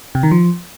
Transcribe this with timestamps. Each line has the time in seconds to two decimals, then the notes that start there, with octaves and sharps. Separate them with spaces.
0.15 C3
0.23 D#3
0.31 F3